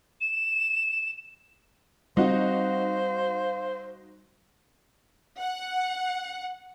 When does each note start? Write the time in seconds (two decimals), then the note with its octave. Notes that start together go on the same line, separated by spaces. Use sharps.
0.20 E7
2.17 G3 C4 D#4 F#4 C5 F5
5.39 F#5